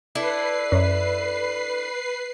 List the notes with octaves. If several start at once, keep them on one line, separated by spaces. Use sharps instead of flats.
D4 E4 A4 B4 C7
F#2